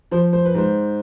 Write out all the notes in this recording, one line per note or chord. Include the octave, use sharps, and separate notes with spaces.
F3 C5
C5
B4
G#2 C5